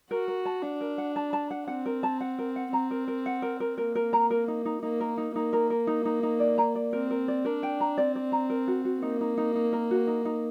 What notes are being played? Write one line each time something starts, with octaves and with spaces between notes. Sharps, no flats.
F#4 A#4
A#4
A5
D4 F#5
A#4
F#5
A5
A5
F#5
C4 F#5
A#4
A5
F#5
A#4
F#5
C4 A#5
A#4
A#4
F#5
A#4
A#4
A#3 A#4
A#4
A#5
A#4
D#4
D#4
A#3 D#4
A#4
D#4
A#3 D#4
A#4
A#4
D#4
D#4
D#4
D5
A#5
D5
C4 A#4
A#4
D5
D4 A#4
G5
A#5
C4 D5
D5
A#5
A#4
F#4
F#4
A#3 D#4
D#4
D#4
D#4
A#4
F#4
D#4
D#4